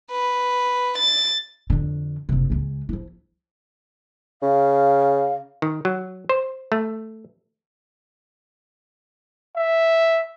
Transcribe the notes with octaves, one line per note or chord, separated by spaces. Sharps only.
B4
A6
F2 D3
F#1 C3
C#2 G#3
F3 E4
C#3 F5
D#3
F#3
C5
A3
E5